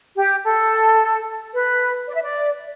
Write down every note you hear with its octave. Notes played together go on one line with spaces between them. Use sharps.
G4
A4
B4
D5
E5
D5